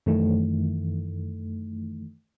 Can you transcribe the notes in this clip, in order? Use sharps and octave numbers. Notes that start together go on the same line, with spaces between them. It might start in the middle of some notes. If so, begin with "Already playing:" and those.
F#2 D#3 E3 A3